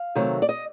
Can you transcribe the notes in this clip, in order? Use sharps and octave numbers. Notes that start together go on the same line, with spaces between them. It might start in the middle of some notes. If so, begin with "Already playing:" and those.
Already playing: F5
C3 D#3 F#3 A3
D5
D#5